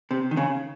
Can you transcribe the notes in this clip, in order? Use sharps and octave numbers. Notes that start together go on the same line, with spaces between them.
C3
D#3
C#3